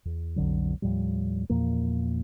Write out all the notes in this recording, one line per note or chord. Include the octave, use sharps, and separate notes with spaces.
E2
B1 F2 D3 F#3
D#2 A2 F3 G3
E2 A#2 F3 A#3